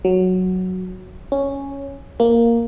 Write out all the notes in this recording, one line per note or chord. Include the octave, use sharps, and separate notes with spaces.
F#3
C#4
A#3